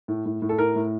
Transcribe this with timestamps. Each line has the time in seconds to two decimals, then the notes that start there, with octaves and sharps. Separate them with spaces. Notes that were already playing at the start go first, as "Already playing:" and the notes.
0.08 A2
0.26 A2
0.42 A2
0.49 A4
0.58 A2 A#4
0.76 A2